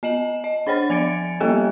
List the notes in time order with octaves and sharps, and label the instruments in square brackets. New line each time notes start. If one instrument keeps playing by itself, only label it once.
[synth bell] B3 D#5 E7 F#7
D#5
D4 C5 C#5 B5 A6
F3 G#5 G#6 A6 C#7 D7
G3 A#3 B3 G4 A4 G5